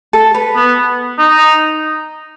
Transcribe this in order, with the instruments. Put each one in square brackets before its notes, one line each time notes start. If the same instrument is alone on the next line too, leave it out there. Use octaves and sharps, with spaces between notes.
[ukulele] A4
B4
[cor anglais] B3
D#4